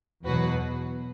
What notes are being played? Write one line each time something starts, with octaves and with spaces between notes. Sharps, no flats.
E2 B2 F#3 F#4 B4